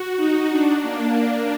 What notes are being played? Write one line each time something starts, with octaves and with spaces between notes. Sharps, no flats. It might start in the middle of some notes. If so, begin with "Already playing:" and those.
Already playing: F#4
D#4
D4
A#3